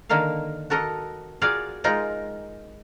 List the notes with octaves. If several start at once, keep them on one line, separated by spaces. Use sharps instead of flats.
D3 D#3 A#3 A#4 F5
F#4 A4 A#4 D#5
F4 F#4 G#4 A#4 D5 F5
G#3 D#4 F4 A#4 A#5